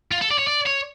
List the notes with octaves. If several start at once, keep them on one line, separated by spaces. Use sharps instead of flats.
F4
A4
D5
C#5
D5
C#5